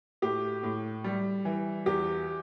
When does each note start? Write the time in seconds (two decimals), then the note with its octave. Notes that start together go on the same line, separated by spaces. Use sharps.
0.22 A2 G4
0.63 A2
1.04 G3
1.45 E3
1.86 E2 G4